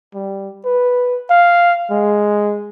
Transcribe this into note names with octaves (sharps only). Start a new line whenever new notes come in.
G3
B4
F5
G#3